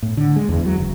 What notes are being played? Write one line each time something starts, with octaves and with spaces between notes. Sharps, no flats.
A2
D3
G#3
E2
F#3
F#1